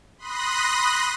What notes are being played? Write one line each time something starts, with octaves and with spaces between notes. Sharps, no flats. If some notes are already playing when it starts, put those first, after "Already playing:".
B5 C6 D#6 F#6 A#6